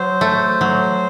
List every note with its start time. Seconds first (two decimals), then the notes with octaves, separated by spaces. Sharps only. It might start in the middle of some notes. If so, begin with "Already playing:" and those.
Already playing: F#3 C5
0.21 A3
0.61 F#3